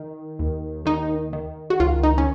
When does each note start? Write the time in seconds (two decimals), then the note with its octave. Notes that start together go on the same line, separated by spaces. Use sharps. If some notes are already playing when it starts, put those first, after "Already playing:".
Already playing: D#3
0.39 D#2
0.86 D#3 D#4
1.33 D#3
1.70 F#4
1.80 C#2 F4
2.03 D#4
2.18 C#4